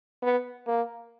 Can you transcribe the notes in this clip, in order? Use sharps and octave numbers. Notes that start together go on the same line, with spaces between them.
B3
A#3